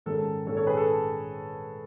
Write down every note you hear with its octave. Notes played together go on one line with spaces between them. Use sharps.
G#2 D#3 G#3 C#4 A4
G#2 D#3 G#3 C#4 A4 C#5
A4 C#5
G#4 B4
A4